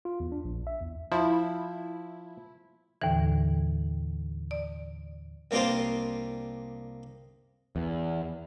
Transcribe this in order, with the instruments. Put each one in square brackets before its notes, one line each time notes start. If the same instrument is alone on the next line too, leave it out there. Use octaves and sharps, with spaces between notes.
[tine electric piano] F4
E2
D4
A#1
E5
E2
[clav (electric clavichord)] F3 [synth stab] E4
[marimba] D#2 A2 D3 E3
D5
[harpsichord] C2 A#3 C4 D4 F4 C5
[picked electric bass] E2